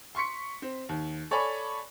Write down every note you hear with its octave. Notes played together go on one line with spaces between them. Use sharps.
C6 C#6 B6 C#7
C4
D#2
A4 C#5 D5 G#5 B5